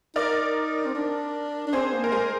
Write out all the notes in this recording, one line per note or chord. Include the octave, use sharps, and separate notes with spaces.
D#4 A#4 D5
C4
D4
D4
C4 G#4 C5
A#3
A#4
G#3 G#4 C5